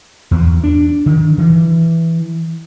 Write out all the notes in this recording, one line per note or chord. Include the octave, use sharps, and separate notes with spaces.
E2
D4
D#3
E3